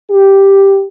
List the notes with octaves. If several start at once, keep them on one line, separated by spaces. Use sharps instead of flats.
G4